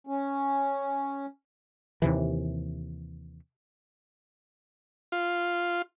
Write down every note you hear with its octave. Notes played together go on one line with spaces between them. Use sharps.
C#4
D#2 C3 E3
F4